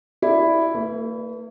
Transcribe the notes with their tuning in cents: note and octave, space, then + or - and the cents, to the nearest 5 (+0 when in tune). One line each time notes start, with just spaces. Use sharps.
E4 +0 D5 +0
A#3 -45 B4 +0